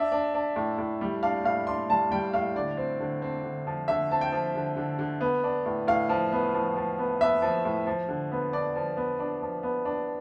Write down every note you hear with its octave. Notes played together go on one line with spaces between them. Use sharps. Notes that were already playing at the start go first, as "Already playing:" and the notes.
Already playing: D4 E5
D4
D4
A2
A2
G3
D4 F5
A2 F5
D4 C6
G3 A5
G3 G5
A2 F5
D3 D5
C4
D3
C4
D3
F3
D3 E5
C4 A5
G5
F3
D3
D3
D3
B3
D4
A2
A2 F5
F3
B3
F3
F3
B3
B3 E5
F3
A2
F3
D3
B3
D4 D5
F3
B3
D4
F3
B3
D4